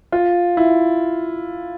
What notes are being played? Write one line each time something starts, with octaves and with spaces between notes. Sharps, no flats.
F4
E4